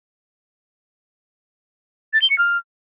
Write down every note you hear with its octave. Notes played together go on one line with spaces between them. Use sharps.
A6
G7
C#7
F6